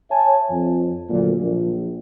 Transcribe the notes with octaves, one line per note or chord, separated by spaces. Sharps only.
C#5 E5 G#5 A5
F2
D2 A#2 F#3
A#1